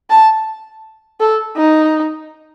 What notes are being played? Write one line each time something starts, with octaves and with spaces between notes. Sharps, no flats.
A5
A4
D#4